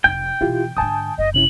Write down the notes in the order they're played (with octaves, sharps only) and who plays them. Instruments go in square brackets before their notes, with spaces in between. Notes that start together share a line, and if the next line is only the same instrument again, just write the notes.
[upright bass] F1 D#4 [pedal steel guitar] G5
[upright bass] B2 E3 [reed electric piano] E4 F4 G4
[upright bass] G#2 D3 [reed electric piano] G#5 A5 D#6
[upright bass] F#1 [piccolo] D#5
[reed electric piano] C3 C#4 E4 [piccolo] F#7